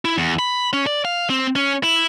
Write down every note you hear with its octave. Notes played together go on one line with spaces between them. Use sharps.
E4
E2
B5
C#4
D5
F5
C4
C#4
E4